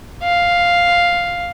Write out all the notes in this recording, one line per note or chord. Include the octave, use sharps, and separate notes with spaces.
F5